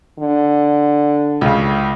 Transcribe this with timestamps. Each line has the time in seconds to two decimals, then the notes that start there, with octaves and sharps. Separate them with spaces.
0.19 D3
1.41 C#2 C#3